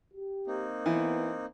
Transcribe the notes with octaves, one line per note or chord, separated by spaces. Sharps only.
G4
A#3 C4 D#4
E3 B3